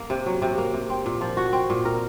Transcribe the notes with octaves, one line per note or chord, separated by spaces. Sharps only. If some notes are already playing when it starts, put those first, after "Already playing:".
Already playing: A#3
C3
F#3
C3
A#3
C3
C4
A#2
F3
F#4
C4
A#2
A#4